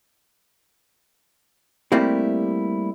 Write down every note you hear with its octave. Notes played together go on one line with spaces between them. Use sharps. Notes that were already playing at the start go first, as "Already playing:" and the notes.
G3 A3 A#3 C4 E4 G4